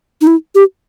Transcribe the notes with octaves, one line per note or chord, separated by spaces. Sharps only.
D#4
E4
G4